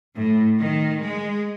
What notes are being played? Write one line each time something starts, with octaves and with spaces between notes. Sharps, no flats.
A2
D#3
G#3